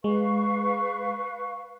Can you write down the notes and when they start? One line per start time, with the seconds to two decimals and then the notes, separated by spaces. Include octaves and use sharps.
0.04 G#3 B4 F5 C#6